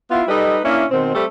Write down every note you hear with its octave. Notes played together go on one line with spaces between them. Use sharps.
B3 E4 F4
G3 D#4 A4 B4 D#5
A#3 C#4 D4 E4
B2 D#3 C4
G3 A3 C4 A4